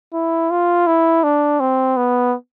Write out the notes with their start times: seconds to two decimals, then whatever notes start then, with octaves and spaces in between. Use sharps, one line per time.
0.14 E4
0.51 F4
0.87 E4
1.23 D4
1.60 C4
1.97 B3